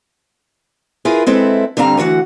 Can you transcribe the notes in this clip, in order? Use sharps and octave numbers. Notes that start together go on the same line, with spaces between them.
E4 F4 G#4 A#4 B4
G#3 C4 E4 A4 B4
G2 D3 G3 C4 F5 A#5
D2 E3 F#4 F#5